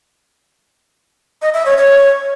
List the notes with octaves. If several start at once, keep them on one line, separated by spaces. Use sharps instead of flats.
D#5
E5
C#5
C#5